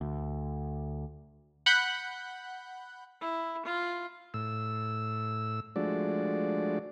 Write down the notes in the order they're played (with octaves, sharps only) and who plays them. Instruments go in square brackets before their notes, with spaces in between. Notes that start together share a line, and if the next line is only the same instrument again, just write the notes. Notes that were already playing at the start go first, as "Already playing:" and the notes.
[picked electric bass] D2
[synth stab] F#5 B5 F#6 G6
[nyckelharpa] E4
F4
[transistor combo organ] A2 E6
F3 G#3 A3 D4 F#4 D5